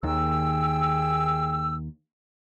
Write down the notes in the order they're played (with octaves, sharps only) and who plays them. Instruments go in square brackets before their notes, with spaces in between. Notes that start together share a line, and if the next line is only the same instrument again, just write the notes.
[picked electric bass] D#2 D#3 [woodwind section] G#4 G5 E6